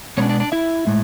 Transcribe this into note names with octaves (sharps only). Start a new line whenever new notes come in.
B2 G#3 B3 C#4 D4 C#5
D4 D5
D4 D5
E4 E5
A2 G#3